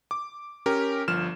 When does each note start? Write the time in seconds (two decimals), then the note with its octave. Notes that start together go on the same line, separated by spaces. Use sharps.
0.11 D6
0.66 C#4 G4 A#4
1.08 G1 F3 F6 E7